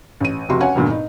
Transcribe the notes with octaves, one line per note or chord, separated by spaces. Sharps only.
A1 D#7
F1 F2 C3 F#4 C6
C#4 C#5 F#5 G#5
F1 E2 G2 A#2 D3
D#4